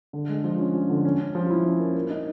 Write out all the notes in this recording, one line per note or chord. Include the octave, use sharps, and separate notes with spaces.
D3
G#3
F3
C#4
F3
D3
C#4
C#4
F3
E4
C#4
A#3
A#3
D#4